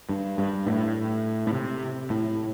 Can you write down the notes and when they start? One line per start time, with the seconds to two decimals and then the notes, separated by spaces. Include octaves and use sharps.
0.09 G2
0.38 G2
0.67 A2
1.47 A2
1.53 C3
2.10 A2